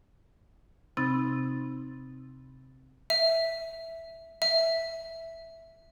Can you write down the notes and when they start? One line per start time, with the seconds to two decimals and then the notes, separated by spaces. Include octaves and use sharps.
0.97 C3 C4 D#4 B5 A6
3.10 E5
4.42 E5